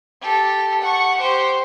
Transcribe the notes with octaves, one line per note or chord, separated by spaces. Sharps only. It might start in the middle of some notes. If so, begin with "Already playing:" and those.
G4 A4
F#5 C#6
G4 C5